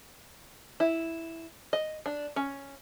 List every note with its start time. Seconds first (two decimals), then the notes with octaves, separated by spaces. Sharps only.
0.80 E4
1.73 D#5
2.06 D4
2.36 C#4